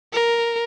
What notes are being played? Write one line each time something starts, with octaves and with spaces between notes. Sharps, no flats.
A#4